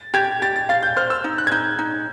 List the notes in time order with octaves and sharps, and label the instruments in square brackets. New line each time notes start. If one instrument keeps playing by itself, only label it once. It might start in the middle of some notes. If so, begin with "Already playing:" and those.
Already playing: [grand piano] A6
[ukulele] G4 [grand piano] G#6
[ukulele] G4 [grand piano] A6
[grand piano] A6
[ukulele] F5 [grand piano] A6
[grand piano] G6
[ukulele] C5 [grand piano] F6
[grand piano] E6
[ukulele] D#4
[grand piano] F#6
G#6
[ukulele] D#4 [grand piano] G6
[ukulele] D#4